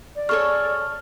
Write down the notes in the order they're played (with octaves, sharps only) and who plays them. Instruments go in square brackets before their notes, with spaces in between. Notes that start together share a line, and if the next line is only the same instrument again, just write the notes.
[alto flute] D5
[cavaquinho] G#4 A4 C#5 [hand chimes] C#6 F6